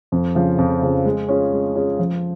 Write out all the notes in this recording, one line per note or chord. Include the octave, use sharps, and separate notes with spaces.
F2
C#3 F3
F2
C#3 F3
G#3
C#4 F4 G#4
G#3
C#4 F4 G#4
F3